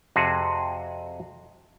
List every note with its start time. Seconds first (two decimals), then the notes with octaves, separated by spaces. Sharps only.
0.16 F2 C3 F#4 G#4